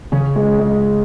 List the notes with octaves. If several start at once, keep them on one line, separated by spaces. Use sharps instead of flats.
C#3 C#4
G#3
G#3